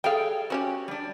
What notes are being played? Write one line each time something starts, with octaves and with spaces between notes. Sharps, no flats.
G3 G#4 A4 F5 G5
C4 C#4 F#4 G4
G3 D4